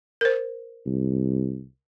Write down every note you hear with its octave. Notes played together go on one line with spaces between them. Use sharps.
A#4 C5
C2